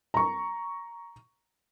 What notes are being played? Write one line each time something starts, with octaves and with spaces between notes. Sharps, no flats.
A#5 C#6